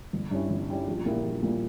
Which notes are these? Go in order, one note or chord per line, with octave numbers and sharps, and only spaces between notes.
G1
G2 G3 C#4 E4
G1
G2 G3 C#4 E4
A#1
A#2 G3 A#3 E4
A#1
A#2 G3 A#3 E4